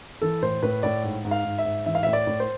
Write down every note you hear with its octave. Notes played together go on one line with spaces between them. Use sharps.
E3 A4
A2 C5
A2 B4
A2 D5
G#2
G#2
F5
G#2
E5
G#2
E3 E5
F5
A2 E5
D5
A2
C5